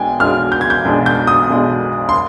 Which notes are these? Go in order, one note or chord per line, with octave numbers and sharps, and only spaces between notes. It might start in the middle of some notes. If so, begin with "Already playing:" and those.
Already playing: B1 B2 G#3 D4 G5 G#5
B1 B2 G#3 D4 F6
G6
G#6
G6
B1 B2 G#3 D4
G6
D#6
B1 B2 G#3 D4
C6